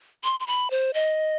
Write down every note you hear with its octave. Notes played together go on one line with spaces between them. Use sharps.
C6
C6
B5
C5
D#5